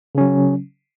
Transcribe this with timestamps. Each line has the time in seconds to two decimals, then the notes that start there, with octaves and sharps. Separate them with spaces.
0.15 C#3
0.18 C#4
0.21 F#3